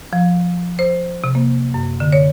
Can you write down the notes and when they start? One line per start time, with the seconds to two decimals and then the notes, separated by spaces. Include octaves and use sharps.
0.13 F3
0.79 C5
1.24 C3
1.35 A#3
1.74 F#2
2.00 D3
2.12 C#5